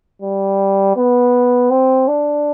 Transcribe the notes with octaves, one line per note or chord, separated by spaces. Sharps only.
G3
B3
C4
D4